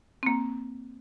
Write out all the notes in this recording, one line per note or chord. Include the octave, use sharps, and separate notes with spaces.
A#3 C4